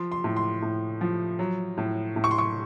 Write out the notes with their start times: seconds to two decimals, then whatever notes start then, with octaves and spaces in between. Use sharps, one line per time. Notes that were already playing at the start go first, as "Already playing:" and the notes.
Already playing: F3 C6
0.12 C6
0.24 A2
0.36 C6
0.62 A2
1.01 F3
1.39 F#3
1.77 A2
2.16 A2
2.24 C#6
2.31 C6
2.38 C#6